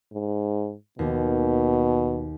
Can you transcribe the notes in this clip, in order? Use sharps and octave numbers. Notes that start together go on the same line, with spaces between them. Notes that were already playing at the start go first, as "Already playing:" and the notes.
G#2
D#2 B2